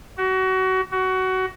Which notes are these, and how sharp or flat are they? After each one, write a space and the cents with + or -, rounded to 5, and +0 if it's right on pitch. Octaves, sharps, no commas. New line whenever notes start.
F#4 +25
F#4 +20